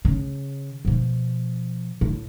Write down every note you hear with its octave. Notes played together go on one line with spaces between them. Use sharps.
C#3
B2 F3
A2